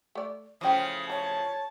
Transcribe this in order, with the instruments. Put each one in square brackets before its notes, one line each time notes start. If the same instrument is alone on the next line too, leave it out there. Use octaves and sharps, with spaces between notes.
[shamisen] A3 D5
[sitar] A2 C#3 F3 [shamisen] E3 G5 [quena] D#6
[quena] C#5 [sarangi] A5 [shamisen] A#5